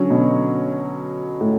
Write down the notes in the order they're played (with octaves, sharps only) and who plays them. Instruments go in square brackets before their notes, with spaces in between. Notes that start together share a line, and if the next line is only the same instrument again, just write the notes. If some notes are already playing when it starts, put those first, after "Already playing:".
Already playing: [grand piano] D3 F#3 C#4
[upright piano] B2
A2